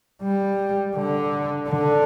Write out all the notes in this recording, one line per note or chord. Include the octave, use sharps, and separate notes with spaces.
G3
D3
D3